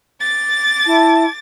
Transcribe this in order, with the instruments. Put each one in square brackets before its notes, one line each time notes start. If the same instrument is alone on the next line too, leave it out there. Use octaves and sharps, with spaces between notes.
[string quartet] D6 A6
[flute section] E4 A5